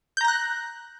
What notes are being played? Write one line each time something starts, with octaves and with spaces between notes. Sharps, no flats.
A#5 F#6 G6 A#6